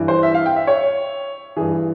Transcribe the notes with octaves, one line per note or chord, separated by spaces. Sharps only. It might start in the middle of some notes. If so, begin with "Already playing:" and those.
Already playing: G2 E3
C5
E5
F5
G5
E5
C#5
G2 E3 G#4